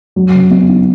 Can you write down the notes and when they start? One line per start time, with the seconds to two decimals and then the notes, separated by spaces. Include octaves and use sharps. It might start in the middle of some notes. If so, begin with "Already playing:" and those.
0.16 F#3
0.34 C#3
0.51 B3
0.69 D#4